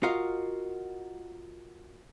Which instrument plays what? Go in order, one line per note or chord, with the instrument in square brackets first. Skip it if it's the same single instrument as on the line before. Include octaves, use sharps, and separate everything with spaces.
[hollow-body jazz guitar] F4 F#4 A#4 D#5 F5